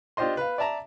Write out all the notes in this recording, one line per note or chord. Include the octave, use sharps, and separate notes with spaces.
D4 F4 G4 C5 D#5 C6
B4 F5
D5 E5 A5 A#5